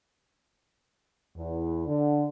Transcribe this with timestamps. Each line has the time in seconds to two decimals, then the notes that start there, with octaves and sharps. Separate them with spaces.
1.37 E2
1.87 D3